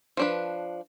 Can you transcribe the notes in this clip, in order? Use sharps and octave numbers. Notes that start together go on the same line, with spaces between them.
F3 D4 B4